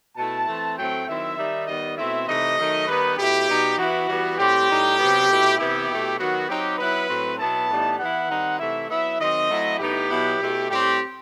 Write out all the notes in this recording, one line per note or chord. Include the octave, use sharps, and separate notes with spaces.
B2 A3 E4 A5
E3 A3 C4
A2 F#3 A3 C4 G5
D#3 F#3 C4 E4 E5
D#3 G3 D#4
D#3 G3 B3 D#5
B2 A3 C4 E4 E5
C3 E3 A3 D#4 D#5
D#3 F#3 A3 D#4
D#3 G3 B3 D#4 B4
B2 A3 E4 G4
B2 G3 D#4
E3 B3 E4 F#4
E3 G3 B3
A2 G3 C4 G4
A2 G3 D#4
C3 F#3 B3
B2 A3 E4
C3 E3 B3 E4 G4
B2 A3 E4
D#3 F#3 B3 F#4
F#3 C4 D#4 G4
F#3 B3 E4 B4
A2 F#3 C4
B2 F#3 B3 E4 A5
A2 E3 G3 B3 D#4
E3 B3 E4 F#5
D#3 G3 C4 D#4
C3 E3 A3 E4 E5
F#3 B3 E4 E5
D#3 F#3 C4 D#5
F#3 A3 C4 E4
A2 E3 B3 D#4 G4
B2 F#3 B3 E4
B2 A3 E4
A2 G3 C4 G4